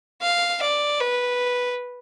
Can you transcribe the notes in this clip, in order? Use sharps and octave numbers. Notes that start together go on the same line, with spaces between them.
F5
D5
B4